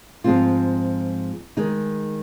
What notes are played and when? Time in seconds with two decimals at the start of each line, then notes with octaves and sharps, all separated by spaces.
0.24 G#2 F3 G#3 C4 F4
1.57 D#3 G#3 D#4